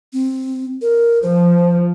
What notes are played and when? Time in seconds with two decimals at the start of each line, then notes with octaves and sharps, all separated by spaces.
0.13 C4
0.82 A#4
1.23 F3 C5